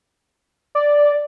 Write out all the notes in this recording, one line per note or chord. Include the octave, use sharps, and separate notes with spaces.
D5